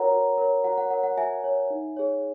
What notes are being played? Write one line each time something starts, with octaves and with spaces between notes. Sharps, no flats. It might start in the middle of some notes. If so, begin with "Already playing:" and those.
Already playing: F#4 A#4 C#5 F#5 A#5
F#4
A#4 C#5
F#4 F#5 A#5
F#5
A#4 C#5 F#5
F#5
F#4 E5 G#5
A#4 C#5
D#4
G#4 C#5